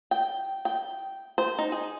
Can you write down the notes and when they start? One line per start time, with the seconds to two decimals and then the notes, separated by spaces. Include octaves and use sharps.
0.11 G5
0.65 G5
1.38 C5
1.59 D#4
1.72 G#4